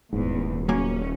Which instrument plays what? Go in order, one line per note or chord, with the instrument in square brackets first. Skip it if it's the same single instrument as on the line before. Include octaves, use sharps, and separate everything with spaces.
[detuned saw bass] D#1 [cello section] E2 [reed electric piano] G#2
[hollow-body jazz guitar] C#3 A#3 G#5 [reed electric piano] F#3 [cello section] C#4